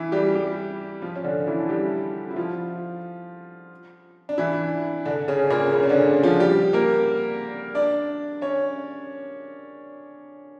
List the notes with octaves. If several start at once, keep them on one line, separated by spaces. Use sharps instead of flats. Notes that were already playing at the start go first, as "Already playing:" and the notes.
Already playing: E3 E4
G3 G4
G3 G4
F3 F4
C#4
D3 D4
E3 E4
A4
G3 G4
E4
F3 F4
D4
E3 E4
D3 D4
C#3 C#4
C#4
A#2 A#3
C#3 C#4
C#4
D3 D4
F3 F4
G3 G4
A#3 A#4
D4 D5
C#4 C#5